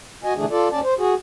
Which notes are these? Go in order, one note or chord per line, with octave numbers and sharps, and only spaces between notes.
F#4 D#5 G#5
B2 D3 E3 A3 D4 G#4
F4 A4 D5
D#2 C#4 D5 A5
C5
F#4 G#4